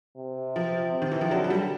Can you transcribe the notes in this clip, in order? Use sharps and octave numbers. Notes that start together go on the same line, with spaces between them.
C3
F3
C3
D#3
E3
F3
D3 F#3
F#3
G3